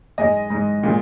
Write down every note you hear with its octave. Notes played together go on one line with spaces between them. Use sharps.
G#2 G#3 D#5 G#5
G#2 G#3
A#2 G#3